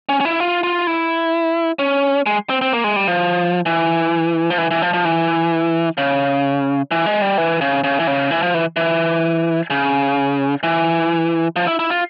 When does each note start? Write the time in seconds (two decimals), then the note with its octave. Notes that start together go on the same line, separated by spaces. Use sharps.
0.09 C#4
0.20 C#4
0.25 E4
0.40 F4
0.63 F4
0.87 E4
1.79 C#4
2.26 G#3
2.50 C4
2.61 C4
2.73 A#3
2.84 G#3
2.96 G3
3.08 F3
3.66 E3
4.50 F3
4.58 E3
4.71 E3
4.82 F3
4.93 F3
5.05 E3
5.98 C#3
6.91 E3
7.06 G#3
7.22 G3
7.38 E3
7.61 C#3
7.84 C#3
8.00 E3
8.07 C#3
8.31 E3
8.42 F3
8.54 E3
8.76 E3
9.70 C#3
10.63 E3
11.56 F3
11.67 E4
11.79 E4
11.90 F4